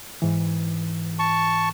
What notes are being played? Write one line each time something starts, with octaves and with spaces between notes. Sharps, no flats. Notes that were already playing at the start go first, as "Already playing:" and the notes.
G#2 E3
A5 C#6